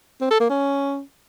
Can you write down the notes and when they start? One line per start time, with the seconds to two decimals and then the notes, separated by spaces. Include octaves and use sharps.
0.21 C4
0.31 A4
0.40 A#3
0.50 C#4